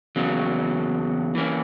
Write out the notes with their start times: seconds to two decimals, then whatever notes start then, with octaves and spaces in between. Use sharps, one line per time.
0.16 E2 C#3 F#3 A#3
1.35 E3 A#3 C#4